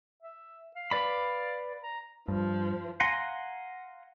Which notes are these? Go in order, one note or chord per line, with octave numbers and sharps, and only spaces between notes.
E5
F5
B4 D5 B5
A#5
G2 F3
F5 F#5 G#5 A#5 C6